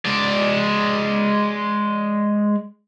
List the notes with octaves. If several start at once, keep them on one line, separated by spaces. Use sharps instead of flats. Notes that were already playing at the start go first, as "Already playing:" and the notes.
G#3 D5